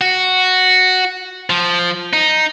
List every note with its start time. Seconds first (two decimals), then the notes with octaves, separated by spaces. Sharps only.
0.01 F#4
1.50 F3
2.13 D#4